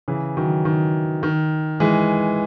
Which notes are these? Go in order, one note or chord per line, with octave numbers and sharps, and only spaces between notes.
C#3 E3
D#3 F#3
D#3
D#3
E3 G#3